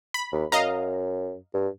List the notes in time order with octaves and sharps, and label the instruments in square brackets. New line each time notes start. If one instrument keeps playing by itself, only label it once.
[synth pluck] B5
[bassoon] D#2
[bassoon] F#2 [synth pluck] D#5 F5 A#5
[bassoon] G2